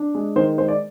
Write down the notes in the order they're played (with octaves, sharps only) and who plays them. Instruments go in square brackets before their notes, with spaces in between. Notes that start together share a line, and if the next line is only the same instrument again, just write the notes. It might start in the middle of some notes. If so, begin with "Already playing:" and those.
Already playing: [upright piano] D4
G#3
D#3 C5
G#3 C5
D5